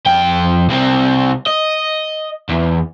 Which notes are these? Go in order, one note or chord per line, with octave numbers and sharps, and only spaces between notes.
F2 G5
C2 C4
D#5
E2